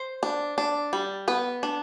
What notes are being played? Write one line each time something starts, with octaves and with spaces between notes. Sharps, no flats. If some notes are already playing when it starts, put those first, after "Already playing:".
Already playing: C5
D4
D4
G3
B3 B4
D4